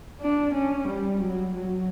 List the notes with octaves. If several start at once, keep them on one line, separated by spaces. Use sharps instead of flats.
D4
C#4
G3
F#3
F#3